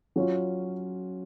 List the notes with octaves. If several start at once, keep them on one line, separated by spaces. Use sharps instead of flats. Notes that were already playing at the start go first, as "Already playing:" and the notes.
F#3 C#4 F4